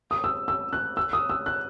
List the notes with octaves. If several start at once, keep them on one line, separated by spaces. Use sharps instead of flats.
D#6
E6
E6
F#6
E6
D#6
E6
F#6